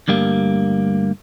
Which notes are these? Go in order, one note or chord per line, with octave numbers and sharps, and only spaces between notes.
D2 G2 G3 A#3